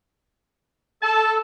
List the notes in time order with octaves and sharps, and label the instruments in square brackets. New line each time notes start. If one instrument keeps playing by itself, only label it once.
[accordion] A4 [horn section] A5